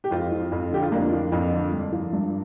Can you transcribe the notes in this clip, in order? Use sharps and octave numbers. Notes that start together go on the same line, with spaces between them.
G4
F2 C4 F4
F3
F2
D3 G4
F4
F2 A#3 D4
F3
F2
D3
G2
F3
G2